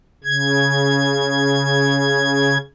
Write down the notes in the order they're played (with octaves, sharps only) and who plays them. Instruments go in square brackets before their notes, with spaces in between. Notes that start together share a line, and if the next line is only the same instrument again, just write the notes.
[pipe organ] C#3 G#6